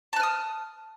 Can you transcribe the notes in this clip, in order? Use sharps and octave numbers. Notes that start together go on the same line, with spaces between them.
A5 D#6 F6 F#6